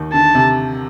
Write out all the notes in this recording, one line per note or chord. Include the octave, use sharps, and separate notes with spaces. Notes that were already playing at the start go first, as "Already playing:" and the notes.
Already playing: D#2 D#3
D3 A5
C3